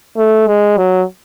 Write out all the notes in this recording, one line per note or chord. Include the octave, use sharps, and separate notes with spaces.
A3
G#3
F#3